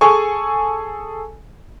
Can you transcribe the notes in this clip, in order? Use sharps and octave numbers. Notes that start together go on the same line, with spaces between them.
G#4 A4 G#5 C#6